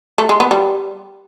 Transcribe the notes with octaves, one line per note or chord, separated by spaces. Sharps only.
A3
G#3
B3
G3